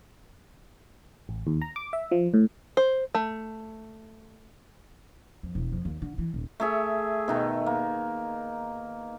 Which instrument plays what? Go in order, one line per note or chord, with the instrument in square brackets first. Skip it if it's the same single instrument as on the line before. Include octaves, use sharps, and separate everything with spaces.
[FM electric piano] A1
D#2
A#5
D6
E5
F3
A2
[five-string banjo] C5
A3
[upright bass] F2
E1
F2
D#2
D3
E3
D#1
[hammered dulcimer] A3 G#4 E5
B2 D#3 A3
A#3